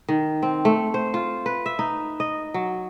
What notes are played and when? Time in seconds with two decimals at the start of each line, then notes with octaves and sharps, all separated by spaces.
0.09 D#3
0.43 C4
0.65 A3
0.94 C5
1.14 F4
1.46 B4
1.66 E5
1.79 D#4
2.20 D#5
2.54 F#3